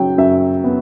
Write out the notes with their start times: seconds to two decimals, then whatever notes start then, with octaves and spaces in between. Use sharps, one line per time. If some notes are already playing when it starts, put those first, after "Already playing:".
Already playing: C#3 F#3 G5
0.18 F#2 E5
0.64 B3